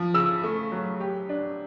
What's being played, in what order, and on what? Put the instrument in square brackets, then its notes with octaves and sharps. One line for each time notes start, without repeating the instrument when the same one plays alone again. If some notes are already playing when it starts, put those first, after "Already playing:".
Already playing: [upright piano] F3
[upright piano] C#3 [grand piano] E6
[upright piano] A3
F#3
G4
D4